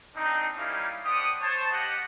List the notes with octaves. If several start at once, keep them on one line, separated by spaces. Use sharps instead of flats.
A#3 C4 D4 D#4
G3 A#3 C#4 D#4 E4 F5
D4 G4 C5 F#5 D#6
C5 C#5 A5
G4 D#5 F#5